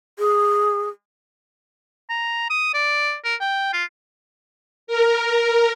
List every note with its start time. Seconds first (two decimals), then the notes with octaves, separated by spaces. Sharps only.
0.19 G#4
2.10 A#5
2.50 D#6
2.74 D5
3.25 A#4
3.41 G5
3.73 F4
4.87 A#4